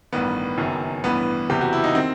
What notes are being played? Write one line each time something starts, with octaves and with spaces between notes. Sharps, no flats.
A1 G2 D#3 B3
F#1 F#2 D#3
A1 G2 E3 B3
F#1 E2 C3 E3 G4
F#4
E4
D#4
D#3 C4